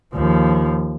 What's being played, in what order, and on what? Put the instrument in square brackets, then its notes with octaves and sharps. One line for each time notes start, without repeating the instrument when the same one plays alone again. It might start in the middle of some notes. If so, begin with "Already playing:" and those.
[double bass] D#2 F3